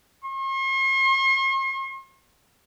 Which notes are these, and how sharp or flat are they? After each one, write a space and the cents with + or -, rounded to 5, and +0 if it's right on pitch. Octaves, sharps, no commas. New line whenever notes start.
C6 +45